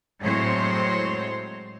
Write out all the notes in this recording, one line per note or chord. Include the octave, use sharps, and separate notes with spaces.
A2 F#3 G#3 C4 C5 C#5